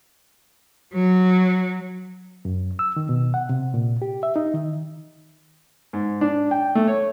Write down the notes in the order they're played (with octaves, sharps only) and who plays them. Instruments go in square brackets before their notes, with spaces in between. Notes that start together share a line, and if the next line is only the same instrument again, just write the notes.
[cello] F#3
[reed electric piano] F#2
E6
D#3
B2
F#5
C3
A#2
G4
E5
D#4
D#3
[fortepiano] G#2
D4
G5
A3
C#5